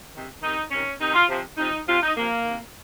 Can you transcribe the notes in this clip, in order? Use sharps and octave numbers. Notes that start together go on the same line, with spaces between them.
C3 D#3
C3 D#3 D#4
C3 D#3 C#4
C3 D#3 D#4
F4
C3 F3
C3 F3 D#4
C3 F3 F4
D#4
C3 F3 A#3
C3 D#3